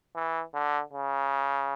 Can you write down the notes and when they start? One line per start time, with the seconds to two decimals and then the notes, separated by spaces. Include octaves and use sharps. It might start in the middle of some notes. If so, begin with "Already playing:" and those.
0.16 E3
0.54 D3
0.93 C#3